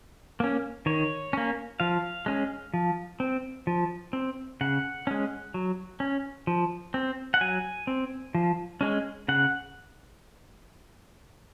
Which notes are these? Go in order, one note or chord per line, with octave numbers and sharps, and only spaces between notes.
A#3 C#4
D#3 C#5
A#3 C#4
F3 F5
G#3 C#4
F3
C4
F3
C4
C#3 F#5
G#3 C#4
F#3
C#4
F3
C4
F#5
F#3 G#5
C4
F3
G#3 C#4
C#3 F#5